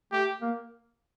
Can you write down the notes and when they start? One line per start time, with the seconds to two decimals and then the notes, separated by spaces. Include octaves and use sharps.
0.12 A3 G4
0.42 A#3